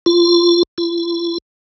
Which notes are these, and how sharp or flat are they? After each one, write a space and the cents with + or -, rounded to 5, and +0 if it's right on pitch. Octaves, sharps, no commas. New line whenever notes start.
F4 -15
F4 -45